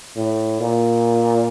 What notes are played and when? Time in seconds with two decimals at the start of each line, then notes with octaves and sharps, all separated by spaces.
0.16 A2
0.60 A#2